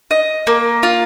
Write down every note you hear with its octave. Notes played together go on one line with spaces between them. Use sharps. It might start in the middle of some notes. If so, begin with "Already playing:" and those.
D#5
A#3
F4